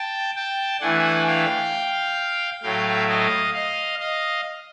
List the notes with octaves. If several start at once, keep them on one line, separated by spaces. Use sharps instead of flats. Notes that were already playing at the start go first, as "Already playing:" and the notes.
Already playing: G5 A5
G5 A5
E3 A3 D4 F#5 G#5
F5 G5
A2 F#3 A3 F5 G5
D#5 F5
D#5 F5
D#5 F5